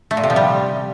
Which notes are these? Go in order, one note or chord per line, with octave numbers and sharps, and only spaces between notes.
A3
A#2
C3
F3
G3